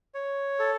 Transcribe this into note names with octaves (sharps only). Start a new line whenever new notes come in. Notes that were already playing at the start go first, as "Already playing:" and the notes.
C#5
A4